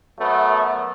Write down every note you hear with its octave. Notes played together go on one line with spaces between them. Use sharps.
F#2 F#3 A3 B3